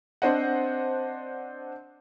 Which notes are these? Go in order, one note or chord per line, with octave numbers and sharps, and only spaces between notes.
C4 D4 C5 D#5 F#5